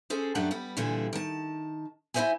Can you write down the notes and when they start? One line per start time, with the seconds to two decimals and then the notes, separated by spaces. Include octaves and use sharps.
0.10 C#4 G#4 A4 C5
0.35 F#2 A3 D4 G4 F#5 A#5
0.51 G3 B3
0.77 A#2 D3 E3 G3 G#4 A4
1.13 D#3 A5
2.14 E4 F#4 A4 C5 E5 G#5